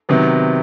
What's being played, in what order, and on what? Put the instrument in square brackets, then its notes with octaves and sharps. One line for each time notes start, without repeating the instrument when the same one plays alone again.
[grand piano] C3 D#3 F#3 B3